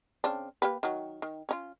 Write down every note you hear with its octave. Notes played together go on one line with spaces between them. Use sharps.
C#3 C4 D4
A#3 G4 B4
D#3 F#3
D#3
C#4 D#4 F4